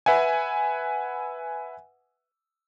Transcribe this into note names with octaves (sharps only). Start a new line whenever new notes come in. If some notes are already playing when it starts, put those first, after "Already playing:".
B4 E5 F#5 G#5